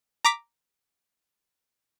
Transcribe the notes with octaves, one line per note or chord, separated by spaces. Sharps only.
A#5 D6 B6